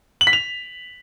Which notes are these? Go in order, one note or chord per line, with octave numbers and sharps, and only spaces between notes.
F#7
B6
F7